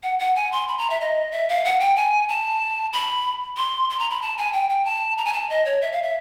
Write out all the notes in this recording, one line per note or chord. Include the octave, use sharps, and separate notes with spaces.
F#5
F#5
G#5
C6
B5
A#5
E5
D#5
E5
F5
F#5
G5
G#5
A5
B5
C6
C6
A#5
B5
A5
G#5
G5
G5
A5
A#5
G#5
A5
D#5
C#5
E5
F5
E5